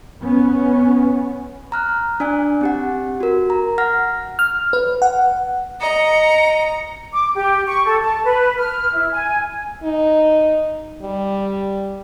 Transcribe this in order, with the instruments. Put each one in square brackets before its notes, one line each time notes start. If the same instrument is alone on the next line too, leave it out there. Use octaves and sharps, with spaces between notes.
[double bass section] B3 C#4
[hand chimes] A#5 F6 F#6
D4 D5 G#5 F#6
C4 G4 F#5
F#4 A#4
A#5
F#5 F6 A#6
[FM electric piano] F6
B4
F#5
[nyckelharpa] D#5 [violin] A#5 [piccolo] C#7
[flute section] D6
G4
C#6
A4
A5
B4
F6
E4
G#5
[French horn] D#4
G3